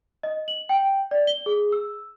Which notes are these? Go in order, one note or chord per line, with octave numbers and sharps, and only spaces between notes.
D#5
F#7
G5
D5
G7
G#4
E6